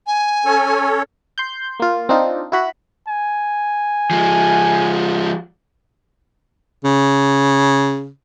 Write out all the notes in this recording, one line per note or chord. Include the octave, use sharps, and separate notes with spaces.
G#5
C#4 A4 C#5
C6 G6
A#3 F4
C4 D4 D#4 F4
E4 F#4 B5
G#5
F3 G#3
C#3